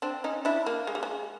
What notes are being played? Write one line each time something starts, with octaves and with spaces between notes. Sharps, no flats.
C4 D4
C#4 D#4
D4 E4
A#3
G#3
G3
G#3